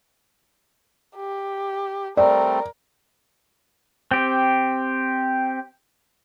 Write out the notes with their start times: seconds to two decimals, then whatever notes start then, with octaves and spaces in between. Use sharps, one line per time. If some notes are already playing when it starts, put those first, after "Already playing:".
1.16 G4
2.17 G3 A3 C4 A#4 D5
4.11 C4 G4